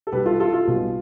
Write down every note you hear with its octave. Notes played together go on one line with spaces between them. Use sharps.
A4
B1 B2 G3 G4 B4
F4 A4
F4 A4
F4
B1 B2 G3